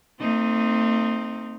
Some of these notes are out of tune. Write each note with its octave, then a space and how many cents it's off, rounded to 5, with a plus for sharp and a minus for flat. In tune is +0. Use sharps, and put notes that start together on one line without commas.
A3 +45 C4 +0 D#4 +0